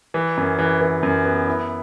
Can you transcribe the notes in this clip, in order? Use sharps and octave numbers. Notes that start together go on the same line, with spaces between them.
E3
F#2
E3
E3
F#2
B3
E4